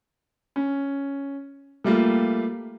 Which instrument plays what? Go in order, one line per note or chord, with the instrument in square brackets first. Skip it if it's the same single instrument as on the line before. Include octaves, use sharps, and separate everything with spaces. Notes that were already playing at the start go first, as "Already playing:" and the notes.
[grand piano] C#4
G3 A3 A#3 F4